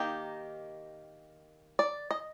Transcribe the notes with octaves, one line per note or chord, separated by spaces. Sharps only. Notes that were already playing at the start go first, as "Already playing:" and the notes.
Already playing: D#3 A#3 D#4 G4
D5
D#5